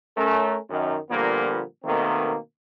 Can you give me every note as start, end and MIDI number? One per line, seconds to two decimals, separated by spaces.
0.17 0.57 57
0.17 0.57 61
0.17 0.57 70
0.70 0.97 42
0.70 0.97 51
1.11 1.63 46
1.11 1.63 50
1.11 1.63 53
1.11 1.63 55
1.11 1.63 58
1.11 1.63 59
1.85 2.36 47
1.85 2.36 51
1.85 2.36 57
1.85 2.36 58
1.85 2.36 60